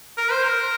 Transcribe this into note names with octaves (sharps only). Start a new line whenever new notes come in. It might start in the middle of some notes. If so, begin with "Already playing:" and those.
A#4
C5
A#4